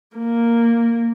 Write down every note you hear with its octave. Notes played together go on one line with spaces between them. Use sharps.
A#3